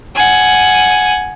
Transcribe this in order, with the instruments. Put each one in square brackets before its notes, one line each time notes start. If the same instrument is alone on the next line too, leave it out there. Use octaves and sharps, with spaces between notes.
[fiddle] F#5 G#5